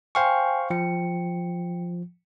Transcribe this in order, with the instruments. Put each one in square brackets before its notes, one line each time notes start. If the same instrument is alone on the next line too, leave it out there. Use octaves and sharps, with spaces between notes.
[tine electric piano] C5 F5 C#6 [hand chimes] G5 G#5
[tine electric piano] F3 [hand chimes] G5 C#7